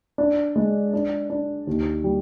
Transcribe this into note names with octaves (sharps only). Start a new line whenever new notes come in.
D4
G#3
D4
D4
D#2
G3